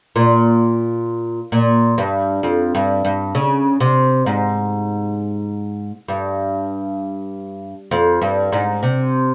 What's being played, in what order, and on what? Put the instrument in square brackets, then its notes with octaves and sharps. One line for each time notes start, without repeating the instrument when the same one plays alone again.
[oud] A#2
A#2
G2
F2
G2
G2
C#3
C3
G#2
G2
F2
G2
G#2
C3